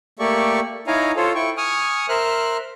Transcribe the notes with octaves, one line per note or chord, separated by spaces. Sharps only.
A3 A#3 G4 A4 D5 C#6
D#4 E4 C#5 F5 G#5 A#5
F4 A4 C5 C#5
E4 G5 C#6
G#5 C#6 D#6 F6
A#4 C5 E5 F6 F#6